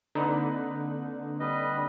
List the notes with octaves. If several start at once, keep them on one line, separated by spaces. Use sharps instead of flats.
D3 A#3 C4 D#4 B4
G3 B4 D#5